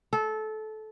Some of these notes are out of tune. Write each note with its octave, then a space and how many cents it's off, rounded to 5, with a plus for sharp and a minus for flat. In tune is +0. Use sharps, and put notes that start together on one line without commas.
A4 -20